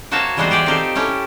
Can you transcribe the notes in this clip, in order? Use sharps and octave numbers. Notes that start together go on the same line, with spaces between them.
A#3 F#4 C5 C#5 E5 A5
E3 G3 G#3 B3 F#4 C5
E3 G4 G#4 D5 G5
C4 D#4 F4 G4 A4 C5
C#4 E4 G4 A4